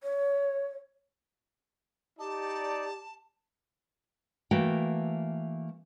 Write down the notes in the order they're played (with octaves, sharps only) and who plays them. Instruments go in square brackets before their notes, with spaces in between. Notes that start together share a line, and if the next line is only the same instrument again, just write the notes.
[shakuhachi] C#5
[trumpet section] D#4 D5 [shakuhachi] G4 [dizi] A5
[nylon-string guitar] E3 A3 A#3 F#4 G5